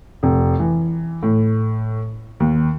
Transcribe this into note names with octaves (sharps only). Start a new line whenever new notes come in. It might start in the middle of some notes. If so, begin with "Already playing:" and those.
F1
E3
A2
D#2